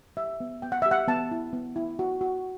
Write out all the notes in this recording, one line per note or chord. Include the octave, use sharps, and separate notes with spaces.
G4 E5
B3
B3 G5
F#5
G4 E5
F#5
B3 A5
E4
B3
E4
F#4
F#4